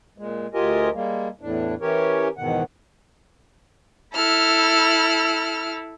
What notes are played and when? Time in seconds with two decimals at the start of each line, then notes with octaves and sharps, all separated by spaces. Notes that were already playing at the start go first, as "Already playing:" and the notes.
0.18 A#2 G#3
0.54 D2 F4 G4 A#4 D#5 G#5
0.94 G3 G#3 A#3
1.41 E2 A2 D4
1.81 E3 C#4 G4 A#4 C#5
2.37 E2 G#2 B2 D#3 F#5
4.13 E4 A4 F6